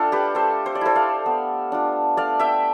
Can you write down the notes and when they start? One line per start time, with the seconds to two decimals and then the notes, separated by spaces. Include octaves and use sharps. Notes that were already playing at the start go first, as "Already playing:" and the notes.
Already playing: A3 D4 F4 A4 F5 G5 A5
0.12 G4 B4
0.35 A3 A4 C5
0.66 C5
0.75 D5
0.81 E4 A4 C5
0.95 D5 F5
1.26 B3
1.72 D4 F4
2.17 A3 D5 F5
2.39 E5 G5